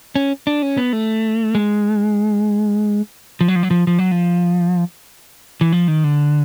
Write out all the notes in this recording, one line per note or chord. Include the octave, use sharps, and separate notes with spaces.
C#4
D4
C#4
B3
A3
G#3
F3
F#3
F3
F#3
F3
F3
F#3
F3
E3
F3
D#3
D3